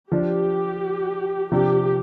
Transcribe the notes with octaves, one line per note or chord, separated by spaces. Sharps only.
F3 D4 G4
C3 F3 D4 G4